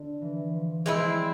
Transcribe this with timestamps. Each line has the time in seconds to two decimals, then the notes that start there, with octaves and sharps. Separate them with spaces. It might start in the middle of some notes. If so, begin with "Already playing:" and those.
Already playing: D3
0.21 E3
0.53 F3
0.86 G3 G#3 C4 E4